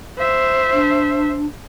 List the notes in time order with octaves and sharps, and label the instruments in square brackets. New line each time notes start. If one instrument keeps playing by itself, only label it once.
[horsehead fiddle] C5 E5
[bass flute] D4